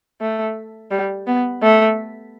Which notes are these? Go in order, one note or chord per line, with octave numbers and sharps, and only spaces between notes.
A3
G3
B3
A3